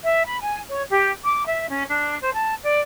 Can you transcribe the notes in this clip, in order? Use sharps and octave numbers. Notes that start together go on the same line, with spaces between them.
E5
B5
G#5
C#5
G4
D6
E5
C#4
D4
C5
A5
D5